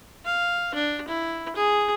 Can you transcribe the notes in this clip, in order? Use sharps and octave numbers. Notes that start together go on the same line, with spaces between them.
F5
D4
E4
G#4